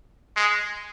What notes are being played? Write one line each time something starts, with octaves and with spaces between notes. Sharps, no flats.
G#3